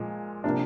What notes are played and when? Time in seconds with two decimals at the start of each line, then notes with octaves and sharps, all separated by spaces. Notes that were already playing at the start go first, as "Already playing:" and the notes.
Already playing: A#2 F3 G#3
0.44 C3 F3 A#3 D4